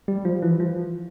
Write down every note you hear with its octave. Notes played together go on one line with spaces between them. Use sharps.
G3
F3
E3
F3